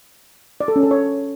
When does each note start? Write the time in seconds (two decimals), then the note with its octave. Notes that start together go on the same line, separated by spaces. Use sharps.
0.61 D5
0.68 A4
0.76 C#4
0.83 A4
0.91 C#5